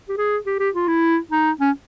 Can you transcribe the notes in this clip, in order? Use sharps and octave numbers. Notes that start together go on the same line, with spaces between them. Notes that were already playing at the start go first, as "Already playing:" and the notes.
G4
G#4
G4
G4
F4
E4
D#4
C#4